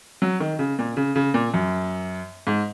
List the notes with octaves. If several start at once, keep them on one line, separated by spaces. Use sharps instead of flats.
F#3
D#3
C#3
A#2
C#3
C#3
A#2
F#2
G#2